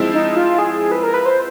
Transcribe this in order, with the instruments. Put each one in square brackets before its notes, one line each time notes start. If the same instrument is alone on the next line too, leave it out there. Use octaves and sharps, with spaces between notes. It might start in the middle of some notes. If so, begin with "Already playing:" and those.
Already playing: [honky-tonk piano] F3 G#3 C4 E4
[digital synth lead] D#4
F4
G#4
B4
A#4
B4
C5